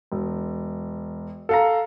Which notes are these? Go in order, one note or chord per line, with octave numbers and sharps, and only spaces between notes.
E1
A4 F5 A#5